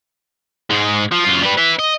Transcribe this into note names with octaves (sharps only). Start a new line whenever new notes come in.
G#2 G#3
F3
F#2 F4
G3 B4
B4 E5
D#5